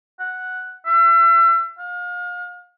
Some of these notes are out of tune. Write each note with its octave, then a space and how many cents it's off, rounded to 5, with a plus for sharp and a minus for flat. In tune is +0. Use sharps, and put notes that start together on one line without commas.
F#5 -5
E5 +35
F5 +35